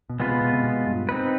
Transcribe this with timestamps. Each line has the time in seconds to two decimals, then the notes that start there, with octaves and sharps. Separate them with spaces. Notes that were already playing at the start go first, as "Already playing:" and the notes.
0.09 B2
0.20 C3 G#3 B3 F4 B4
0.31 B2
0.41 B2
0.53 C3
0.64 B2
0.87 G2
1.09 C4 D#4 B4